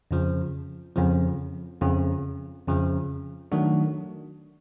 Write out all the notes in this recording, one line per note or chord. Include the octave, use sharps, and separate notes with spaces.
F2 C#3 F3
F2 C#3 F3
F2 C#3 F3
F2 C#3 F3
D#3 F#3 A3 D4 F#4